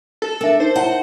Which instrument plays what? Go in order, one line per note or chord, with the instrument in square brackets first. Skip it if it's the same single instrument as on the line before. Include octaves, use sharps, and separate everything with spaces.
[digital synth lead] A4
[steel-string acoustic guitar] D4 [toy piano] A#4 E5
[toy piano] D#4 [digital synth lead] C5
[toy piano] E4 C#5 A5 [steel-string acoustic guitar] F#5